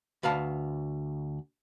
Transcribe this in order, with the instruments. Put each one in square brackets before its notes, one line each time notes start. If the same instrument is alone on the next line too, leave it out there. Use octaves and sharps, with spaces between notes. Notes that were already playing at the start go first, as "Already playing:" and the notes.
[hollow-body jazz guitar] D2 B4 F5 A5